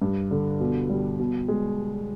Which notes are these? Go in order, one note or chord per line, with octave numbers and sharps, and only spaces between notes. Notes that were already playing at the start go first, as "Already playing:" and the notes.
G2
D3
B2
G3
B2
G#3